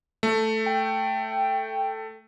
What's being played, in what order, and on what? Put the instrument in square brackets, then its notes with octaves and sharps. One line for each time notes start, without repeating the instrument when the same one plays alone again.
[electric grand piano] A3
[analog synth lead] G5